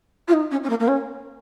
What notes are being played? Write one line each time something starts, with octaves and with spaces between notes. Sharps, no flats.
F4
D#4
C#4
C#4
A#3
A#3
C#4